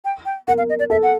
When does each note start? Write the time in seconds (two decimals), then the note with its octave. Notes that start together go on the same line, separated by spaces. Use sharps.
0.05 G5
0.25 G5
0.48 A#4 F#5
0.58 F5
0.69 D#5
0.79 D5
0.90 A4 E5
1.03 F#5